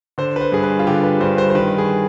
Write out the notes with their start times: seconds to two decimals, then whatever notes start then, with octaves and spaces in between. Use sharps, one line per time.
0.18 D3 C5
0.36 B4
0.41 C5
0.52 G2 G#4
0.64 B4
0.79 F4
0.87 D3 G4
1.03 B4
1.20 G2 C5
1.38 C5
1.50 C5
1.55 D#3 B4
1.78 G#4